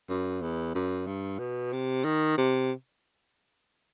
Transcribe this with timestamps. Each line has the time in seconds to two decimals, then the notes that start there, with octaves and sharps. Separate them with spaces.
0.09 F#2
0.42 E2
0.75 F#2
1.07 G2
1.39 B2
1.73 C3
2.05 D#3
2.38 C3